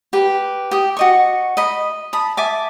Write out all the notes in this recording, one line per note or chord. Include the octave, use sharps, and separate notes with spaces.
G4 B4
G4 D#6
F#4 D#5 C#6
D#5 B5
A5 B5 D#6
E5 G#5 A5 D6